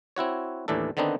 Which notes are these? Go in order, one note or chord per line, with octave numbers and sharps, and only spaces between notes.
C4 E4 F#4 C#5
D#2 A2 E3 D4 A4
D3 D#3 B3 C4 D4 D#4